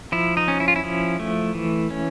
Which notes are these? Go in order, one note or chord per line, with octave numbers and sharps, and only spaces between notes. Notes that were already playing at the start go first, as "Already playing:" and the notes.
F3 E4
D#4
C#4
E4
F4
E4
F3
A3
E3
C#4